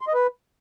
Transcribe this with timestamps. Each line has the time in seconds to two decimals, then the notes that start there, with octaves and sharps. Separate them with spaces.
0.01 C6
0.08 D#5
0.14 B4